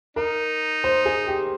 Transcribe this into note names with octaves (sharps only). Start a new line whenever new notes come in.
D#4 A#4
C5
G#4
G4